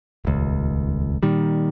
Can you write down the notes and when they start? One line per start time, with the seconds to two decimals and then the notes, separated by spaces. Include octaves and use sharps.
0.25 D#1 C#2
1.23 A#2 D#3 G3